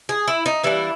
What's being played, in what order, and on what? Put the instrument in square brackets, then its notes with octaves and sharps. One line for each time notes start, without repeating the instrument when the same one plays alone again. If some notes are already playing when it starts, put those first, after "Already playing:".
[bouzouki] G#4
E4
D#4
E3 G3 A#3 D4 E4